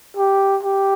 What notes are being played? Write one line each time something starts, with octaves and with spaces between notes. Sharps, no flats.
G4
G4